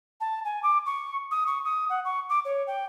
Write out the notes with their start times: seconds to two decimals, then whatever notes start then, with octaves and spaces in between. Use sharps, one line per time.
0.21 A5
0.45 G#5
0.63 D6
0.86 C#6
1.31 D#6
1.47 C#6
1.65 D#6
1.90 F#5
2.05 C#6
2.29 D6
2.45 C#5
2.67 G5